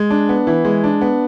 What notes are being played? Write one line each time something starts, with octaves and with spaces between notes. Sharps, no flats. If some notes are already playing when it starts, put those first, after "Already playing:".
Already playing: G#3
D4
B3
E3
G#3
D4
B3